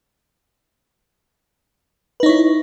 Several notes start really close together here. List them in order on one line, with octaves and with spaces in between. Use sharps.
B4 D#4 C#5 E4